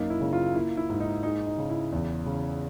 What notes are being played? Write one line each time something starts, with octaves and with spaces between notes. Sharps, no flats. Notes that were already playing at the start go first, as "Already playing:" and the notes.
Already playing: F#2 A#3 D#4
E4
C#3
F4
A#3 E4
E4
G#2
D#4
G#3 D#4
D#4
C#3
E4
E2
C#3